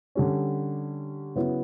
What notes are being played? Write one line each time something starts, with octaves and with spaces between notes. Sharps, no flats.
D3 G3 C#4
C#3 F#3 B3 E4